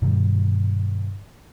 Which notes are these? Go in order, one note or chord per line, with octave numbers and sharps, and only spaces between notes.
G2 B2 D#3 G3